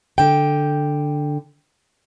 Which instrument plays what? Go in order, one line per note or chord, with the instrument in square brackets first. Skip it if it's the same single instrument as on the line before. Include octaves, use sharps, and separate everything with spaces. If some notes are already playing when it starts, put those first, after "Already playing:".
[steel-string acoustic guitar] D3 G5